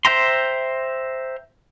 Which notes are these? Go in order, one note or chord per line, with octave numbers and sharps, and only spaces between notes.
C5 E5 G5 A#5 C6